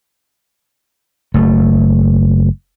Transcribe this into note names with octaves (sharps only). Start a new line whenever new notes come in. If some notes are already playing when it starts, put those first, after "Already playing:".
F#1 A3